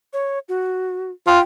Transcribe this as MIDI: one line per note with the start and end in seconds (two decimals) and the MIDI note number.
0.13 0.39 73
0.49 1.11 66
1.27 1.39 65
1.27 1.43 79